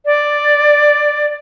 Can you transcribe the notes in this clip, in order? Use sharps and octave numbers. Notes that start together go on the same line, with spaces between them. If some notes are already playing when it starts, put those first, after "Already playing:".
D5